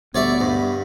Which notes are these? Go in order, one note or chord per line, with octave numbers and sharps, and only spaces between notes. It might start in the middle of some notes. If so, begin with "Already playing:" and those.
D2 G3 B3 C#5 D5 E5
G2